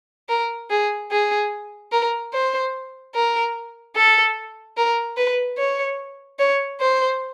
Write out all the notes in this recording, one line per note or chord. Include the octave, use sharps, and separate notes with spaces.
A#4
G#4
G#4
A#4
C5
A#4
A4
A#4
B4
C#5
C#5
C5